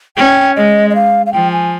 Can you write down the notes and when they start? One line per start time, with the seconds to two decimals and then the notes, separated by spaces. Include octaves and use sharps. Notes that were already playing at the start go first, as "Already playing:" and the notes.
0.17 C#4 G5
0.56 G#3 D#5
0.90 D#5
0.95 F5
1.26 F5
1.33 F3 G5
1.52 G#5